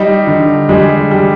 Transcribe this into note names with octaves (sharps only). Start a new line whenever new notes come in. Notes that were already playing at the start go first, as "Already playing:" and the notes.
Already playing: G3 D#4
D3
G3 G#3 G#4
G3